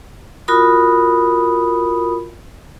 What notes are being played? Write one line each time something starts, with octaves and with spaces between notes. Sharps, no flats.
F4 F#4 A#4 B5 D#6